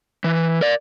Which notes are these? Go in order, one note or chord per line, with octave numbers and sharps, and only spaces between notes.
E3
A#4 D5